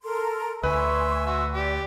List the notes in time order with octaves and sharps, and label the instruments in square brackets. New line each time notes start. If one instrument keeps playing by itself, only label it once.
[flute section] A4 A#4 C6
[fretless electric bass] D2 [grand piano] B4 [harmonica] E5 [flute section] G#5 C6 C#6
[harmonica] F#4 E5
[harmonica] G4 [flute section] D5